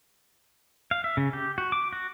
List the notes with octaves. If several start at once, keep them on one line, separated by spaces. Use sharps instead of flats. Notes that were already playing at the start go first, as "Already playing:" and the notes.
F5
E5
C#3
G4
F#4
D6
F#4